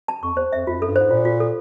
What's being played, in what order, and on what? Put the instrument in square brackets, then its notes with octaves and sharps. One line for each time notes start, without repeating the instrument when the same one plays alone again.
[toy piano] A5
[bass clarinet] F2 [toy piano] C#6
[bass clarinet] E2 [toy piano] C5
[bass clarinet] F2 [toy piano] E5
[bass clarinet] F2 [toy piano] F4
[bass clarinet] F#2 [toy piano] A4
[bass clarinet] G2
[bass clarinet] G#2 [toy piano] C5
[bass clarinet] A#2 [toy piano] F4
[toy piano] F4
A4